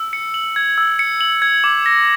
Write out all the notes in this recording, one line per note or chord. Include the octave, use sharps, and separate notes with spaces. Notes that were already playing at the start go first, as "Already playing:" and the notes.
Already playing: E6
C#7
F#7
G#6
E6
C#7
F#7
G#6
D6
A#6